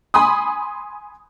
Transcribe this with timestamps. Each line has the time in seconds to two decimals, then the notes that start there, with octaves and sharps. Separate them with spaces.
0.14 G#5 B5 C6 D#6